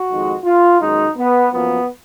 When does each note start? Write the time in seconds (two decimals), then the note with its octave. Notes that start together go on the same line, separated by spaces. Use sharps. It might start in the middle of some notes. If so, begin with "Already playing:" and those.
Already playing: F#4
0.09 F2 D#3 G#3
0.44 F4
0.80 F#2 D#3 G#3 D#4
1.17 B3
1.53 F#2 F3 A#3 B3